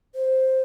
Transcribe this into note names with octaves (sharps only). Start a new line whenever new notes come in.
C5